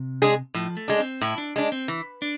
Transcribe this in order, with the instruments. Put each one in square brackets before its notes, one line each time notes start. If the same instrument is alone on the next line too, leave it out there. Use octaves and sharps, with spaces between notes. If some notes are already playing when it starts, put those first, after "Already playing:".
Already playing: [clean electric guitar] C3
[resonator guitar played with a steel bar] G#3 D4 G#4
[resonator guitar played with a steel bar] A2 [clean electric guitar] F3
[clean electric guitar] A3
[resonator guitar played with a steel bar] G#3 D4
[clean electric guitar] C4
[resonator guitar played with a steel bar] A2 [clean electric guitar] E4
[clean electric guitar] D4
[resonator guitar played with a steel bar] G#3 D4
[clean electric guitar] C4
[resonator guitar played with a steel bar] E3
[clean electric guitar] D4